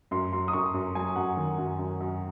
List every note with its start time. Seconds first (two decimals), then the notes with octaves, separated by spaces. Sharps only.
0.11 F#2 C6
0.33 F#3 C6
0.48 D#6
0.53 F#2 C#6
0.74 F#2
0.95 F#3 G#5
1.16 F#2 F#5
1.37 D#3
1.58 F#2
1.79 F#2
2.00 F#2